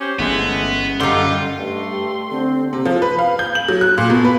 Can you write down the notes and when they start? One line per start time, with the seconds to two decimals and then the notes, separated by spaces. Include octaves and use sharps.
0.01 C#4 G4 C5
0.19 G1 E3 G#3 A3 B3 C#4
1.00 F#2 D3 G3 C#4 D#4 F5 C6
1.59 G2 A3 C6
1.92 G4
2.31 D3 C4
2.73 C3
2.85 F3
3.02 B4
3.19 F5
3.39 G6
3.55 F#7
3.69 F#3
3.81 F#6
3.98 A#2
4.10 B2
4.25 B4